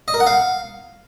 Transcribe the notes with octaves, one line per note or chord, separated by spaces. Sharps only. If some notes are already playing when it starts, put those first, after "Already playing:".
D#5
A#4
F#5
F5